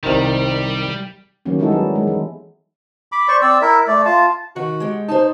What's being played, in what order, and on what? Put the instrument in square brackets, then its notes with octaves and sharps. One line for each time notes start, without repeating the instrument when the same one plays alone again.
[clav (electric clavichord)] C2 C3 D#3 [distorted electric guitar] G3
[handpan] D#3 F#3 A#3 C#4
G3 G#3 D#4 E4 F#4 A4
F#3 B3
G#3
E3
[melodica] B5 D6
C5 D5 C#6
C4 D5 E6
E4 A#4 E5
A3 D5
F4 A5
[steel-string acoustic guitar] D#3 [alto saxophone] F#4
[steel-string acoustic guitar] G#3 G4
[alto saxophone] D#4 [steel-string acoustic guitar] C5 A5